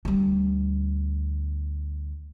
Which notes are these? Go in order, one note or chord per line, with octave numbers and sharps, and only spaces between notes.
D2 G3